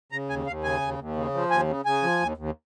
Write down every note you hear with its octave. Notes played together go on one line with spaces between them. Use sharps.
C#3 A#5
D#2 G#5
D#2 F5
C#3 G#5
D#2
D#2
C#3
F3
D#2 G#5
C#3
C#3 G#5
F3
D#2
D#2